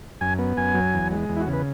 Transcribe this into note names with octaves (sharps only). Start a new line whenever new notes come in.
F#2 G#5
B3
F#2 G#5
F#3
E2
G#3
E2
E4
F#4
C#3
B4